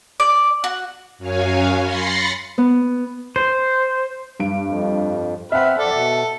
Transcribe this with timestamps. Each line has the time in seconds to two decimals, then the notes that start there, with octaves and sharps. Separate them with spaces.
0.20 D5
0.64 F#4
1.18 F#2 F#3 C#5 F5 G#5
1.81 B5 C6 A6 A#6 C7 C#7
2.58 B3
3.36 C5
4.40 G2 D7
4.65 F2
5.52 C4 B4 E5 F#5 F6
5.78 F2 A4 D5
5.93 B2